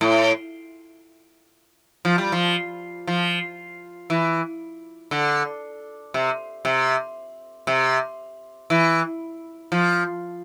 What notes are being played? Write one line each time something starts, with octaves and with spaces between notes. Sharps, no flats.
A2
F3
G3
F3
F3
E3
D3
C3
C3
C3
E3
F3